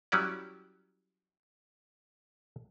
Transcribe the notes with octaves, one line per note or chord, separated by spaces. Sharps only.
F#3 G3 C#4 E4 D5